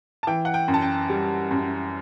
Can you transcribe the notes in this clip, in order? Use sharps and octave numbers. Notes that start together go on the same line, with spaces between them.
A5
E3 G5
F#5
G5
F#2
A5
G5
G3
F#2